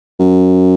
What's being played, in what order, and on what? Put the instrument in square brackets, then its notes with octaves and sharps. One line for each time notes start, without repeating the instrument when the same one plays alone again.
[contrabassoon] F#2